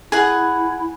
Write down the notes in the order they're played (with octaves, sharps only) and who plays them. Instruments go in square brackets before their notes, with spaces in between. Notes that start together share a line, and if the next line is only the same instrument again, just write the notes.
[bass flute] E4 [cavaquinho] G#4 F#5